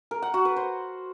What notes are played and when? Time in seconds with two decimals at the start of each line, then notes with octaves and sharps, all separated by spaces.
0.11 A#4
0.22 F#5
0.34 F#4
0.45 B4
0.56 C5